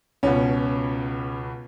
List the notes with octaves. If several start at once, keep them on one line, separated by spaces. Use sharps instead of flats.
C#2 B2 C#4